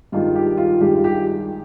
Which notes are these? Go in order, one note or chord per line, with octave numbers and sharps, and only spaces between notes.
G2 D#3 G#3 F4
G4
F4
G2 D#3 G#3 G4
F4
G4